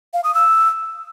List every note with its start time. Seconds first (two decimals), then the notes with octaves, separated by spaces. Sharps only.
0.13 F5
0.24 D#6
0.34 E6